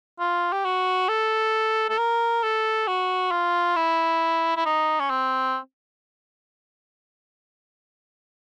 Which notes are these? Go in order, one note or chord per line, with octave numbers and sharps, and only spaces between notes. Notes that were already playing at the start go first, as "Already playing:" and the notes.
F4
G4
F#4
A4
A4
A#4
A4
F#4
F4
E4
E4
D#4
C#4
C4